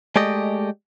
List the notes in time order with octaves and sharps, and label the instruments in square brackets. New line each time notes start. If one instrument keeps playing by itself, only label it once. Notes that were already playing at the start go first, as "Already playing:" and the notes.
[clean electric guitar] G#3 A3 G4 D5 D#5